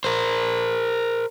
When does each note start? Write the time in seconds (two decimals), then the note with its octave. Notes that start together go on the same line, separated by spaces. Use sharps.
0.04 A#4 C5